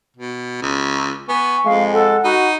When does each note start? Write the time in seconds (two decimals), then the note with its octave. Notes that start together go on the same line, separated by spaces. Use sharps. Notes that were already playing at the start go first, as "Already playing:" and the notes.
0.17 B2
0.62 C#2
1.29 B3 G#5 C#6
1.65 F2 G#3 F5
1.94 A4 F#5
2.24 D#4 F#4 B5